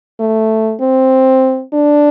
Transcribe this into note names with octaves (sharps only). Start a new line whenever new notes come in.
A3
C4
D4